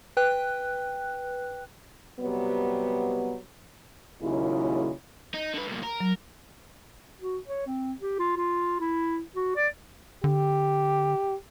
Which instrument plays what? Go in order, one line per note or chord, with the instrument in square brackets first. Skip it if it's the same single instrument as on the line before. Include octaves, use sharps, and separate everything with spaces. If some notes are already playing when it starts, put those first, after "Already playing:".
[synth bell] B4 G5 F#6
[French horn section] C3 F#3 G3 B3
D#2 A#2 C#3 F#3 G#3 E4
[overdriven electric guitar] D#4
D3 B4
C2 A#2
A#4
[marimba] F#3
[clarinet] F#4
C#5
C4
G4
F4
F4
E4
F#4
D5
[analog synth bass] D3 [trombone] G4